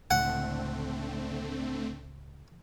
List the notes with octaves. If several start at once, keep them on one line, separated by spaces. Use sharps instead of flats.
C#2 A2 D3 A3 C4 F#5